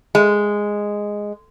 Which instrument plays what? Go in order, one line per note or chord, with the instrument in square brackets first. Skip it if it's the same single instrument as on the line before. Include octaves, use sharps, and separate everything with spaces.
[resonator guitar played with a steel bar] G#3